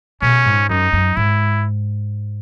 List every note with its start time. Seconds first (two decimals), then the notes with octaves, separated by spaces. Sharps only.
0.22 B2 C#4
0.46 G#2
0.69 F#2 D#4
0.93 F#2
1.16 G#2 E4